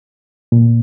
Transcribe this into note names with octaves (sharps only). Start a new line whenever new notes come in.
A#2